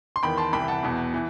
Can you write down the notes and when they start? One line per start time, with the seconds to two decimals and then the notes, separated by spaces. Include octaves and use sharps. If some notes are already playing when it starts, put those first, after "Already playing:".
0.16 C6
0.23 E2 D#3 G5 B5
0.37 A5 C6
0.53 C2 C3 E3 G5 B5
0.68 F#5 A5
0.83 E2 B2
1.14 E3